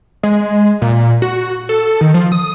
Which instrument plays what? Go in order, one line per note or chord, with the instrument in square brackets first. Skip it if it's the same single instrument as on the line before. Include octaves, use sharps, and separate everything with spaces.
[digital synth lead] G#3
A#2
F#4
A4
D#3
F3
D#6